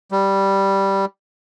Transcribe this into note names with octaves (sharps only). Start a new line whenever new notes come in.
G3